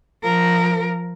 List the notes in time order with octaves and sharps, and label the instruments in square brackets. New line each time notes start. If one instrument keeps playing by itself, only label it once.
[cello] F3 A#4